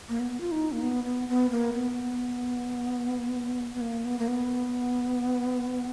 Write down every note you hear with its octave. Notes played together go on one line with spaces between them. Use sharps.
A#3
B3
F4
D#4
A#3
B3
B3
B3
A#3
B3
B3
A#3
B3
A#3
B3